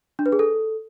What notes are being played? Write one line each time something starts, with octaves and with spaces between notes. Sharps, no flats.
D4
B4
G#4
A4